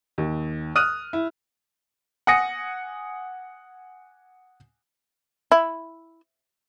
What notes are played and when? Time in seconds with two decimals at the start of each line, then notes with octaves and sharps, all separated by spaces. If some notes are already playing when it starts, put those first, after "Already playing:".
0.18 D#2
0.76 D#6 F6 F#6 D#7
1.13 E4
2.27 F#5 G#5 D#6 A#6 C#7
5.52 E4